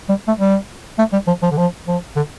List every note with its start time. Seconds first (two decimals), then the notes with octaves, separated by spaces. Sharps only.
0.09 G3
0.28 A3
0.38 G3
0.98 A3
1.13 G3
1.27 F3
1.42 F3
1.52 D3
1.57 F3
1.88 F3
2.16 D3